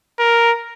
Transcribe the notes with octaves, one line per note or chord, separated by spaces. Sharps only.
A#4